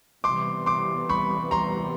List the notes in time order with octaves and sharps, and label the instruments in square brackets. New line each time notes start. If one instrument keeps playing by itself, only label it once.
[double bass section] C3 E3 G3 B3 [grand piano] C6 D6
[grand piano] C6 D6
B5 C#6
A#5 C6